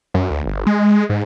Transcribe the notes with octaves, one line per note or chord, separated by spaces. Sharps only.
F#2
D2
G1
G#3
G#2